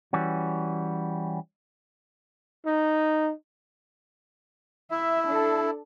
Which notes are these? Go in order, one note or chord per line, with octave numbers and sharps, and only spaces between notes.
E3 G3 C#4 F#4
D#4
E4 E5
D4 A4